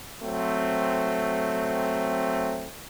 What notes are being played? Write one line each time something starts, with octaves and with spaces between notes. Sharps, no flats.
F#3 A3 C4